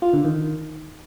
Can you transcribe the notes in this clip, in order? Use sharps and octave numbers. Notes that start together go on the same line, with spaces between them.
F4
D3
D#3